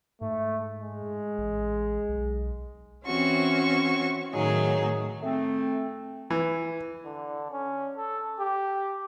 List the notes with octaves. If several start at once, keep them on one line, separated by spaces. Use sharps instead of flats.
G#2 A3
G#3
A1
B1
E3 C4 C#4 F#4 C#6
A2 D#3 F#3 D#4 G#4
A3 C4
E3
D3
C#4
A4
G4